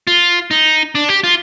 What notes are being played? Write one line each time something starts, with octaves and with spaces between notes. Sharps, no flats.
F4
D#4
D4
G4
F4